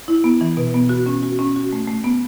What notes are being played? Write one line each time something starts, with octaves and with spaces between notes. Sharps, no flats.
E4
B3
E3
B2
B3
F#4
C#4
F#4
C#4
F#4
A3
A3
B3